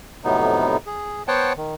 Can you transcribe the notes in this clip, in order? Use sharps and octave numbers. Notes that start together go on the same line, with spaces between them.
F2 A2 C3 F#3 B3 D#4
G#4
B3 C5 C#5 F#5 G5 A5
D#3